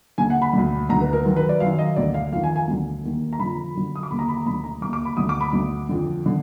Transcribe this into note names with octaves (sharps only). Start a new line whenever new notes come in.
D#2 D3 G#5
F#5
B5
D2 D3
D2 D3 A#5
B4
A#4
F#2 D#3
B4
D5
F#2 D#3 F5
D#5
D2 D3 D5
F5
F2 D#3 F5
G#5
G#5
D2 D3
D#2 D#3
A#5
F2 D3 B5
F#2 D3
D#6
D6
D#2 D3 B5
A#5
B5
A#5
D2 D3 B5
A#5
D#2 D3 D6
D6
B5
D2 D3 D#6
D6
B5
D2 D3
F2 D3
D3